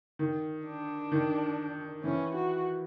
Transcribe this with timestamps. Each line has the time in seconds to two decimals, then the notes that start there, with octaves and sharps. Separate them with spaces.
0.19 D#3
0.66 D4
1.12 D#3
2.04 E3 C#4
2.35 F#4